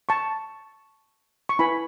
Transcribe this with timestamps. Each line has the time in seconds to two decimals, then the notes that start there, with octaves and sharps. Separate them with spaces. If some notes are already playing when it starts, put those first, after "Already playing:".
0.09 A5 C#6
1.49 C#6
1.59 E4 B4 G#5 B5